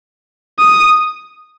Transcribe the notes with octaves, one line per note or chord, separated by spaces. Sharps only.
D#6